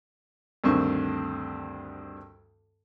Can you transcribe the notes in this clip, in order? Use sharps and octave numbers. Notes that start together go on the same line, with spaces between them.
D2 G2 D#3 C4 C#6